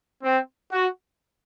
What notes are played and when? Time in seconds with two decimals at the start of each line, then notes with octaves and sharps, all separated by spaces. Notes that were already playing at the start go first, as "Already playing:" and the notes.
0.24 C4
0.72 F#4